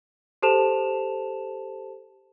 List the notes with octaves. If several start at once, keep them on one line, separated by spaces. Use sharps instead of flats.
G4 A4 C5 A5 E7 F7